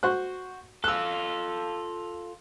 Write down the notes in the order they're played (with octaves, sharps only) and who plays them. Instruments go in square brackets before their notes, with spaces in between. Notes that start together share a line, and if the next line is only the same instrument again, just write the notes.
[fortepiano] F#4 C5 F#6
[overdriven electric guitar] F4 A4 [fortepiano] E6 F#6